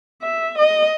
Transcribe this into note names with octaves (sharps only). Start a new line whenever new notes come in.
E5
D#5